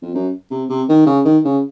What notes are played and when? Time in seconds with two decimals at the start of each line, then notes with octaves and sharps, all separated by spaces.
0.02 F2
0.15 F#2
0.51 C3
0.70 C3
0.89 D#3
1.06 C#3
1.25 D#3
1.45 C#3